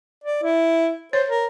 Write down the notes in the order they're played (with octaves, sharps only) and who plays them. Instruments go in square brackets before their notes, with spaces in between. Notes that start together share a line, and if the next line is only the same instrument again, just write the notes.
[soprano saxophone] D5
E4
[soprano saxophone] C5 [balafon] C#5
[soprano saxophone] A#4